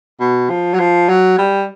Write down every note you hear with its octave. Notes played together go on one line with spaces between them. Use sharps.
B2
F3
F#3
F3
F#3
G3